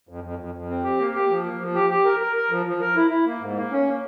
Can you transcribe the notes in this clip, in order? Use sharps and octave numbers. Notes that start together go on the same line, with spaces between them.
F2
F2
F2
F2
C4
G4
A#3
G4
F3
A#3
F3
G4
G4
A#4
A#4
A#4
F3
F3
A#4
E4
E4
A#3
G#2
A#3
C#4
A#3